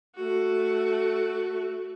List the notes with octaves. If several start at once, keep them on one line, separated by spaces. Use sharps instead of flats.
A3 F#4